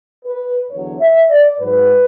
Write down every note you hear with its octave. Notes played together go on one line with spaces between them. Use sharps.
B4
E2 D3 F#3 C#5
E5
D5
G#2 F#3 B4